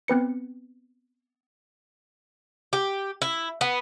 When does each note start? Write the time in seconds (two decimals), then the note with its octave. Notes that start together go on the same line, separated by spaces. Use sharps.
0.08 B3 C4 B4 C#7
2.73 G4
3.22 E4
3.61 B3